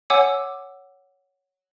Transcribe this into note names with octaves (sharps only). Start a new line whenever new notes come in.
C#5 F#5 G#5 D6 E6